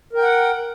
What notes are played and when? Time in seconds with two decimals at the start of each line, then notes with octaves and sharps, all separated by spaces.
0.13 A#4
0.18 G5
0.22 F#5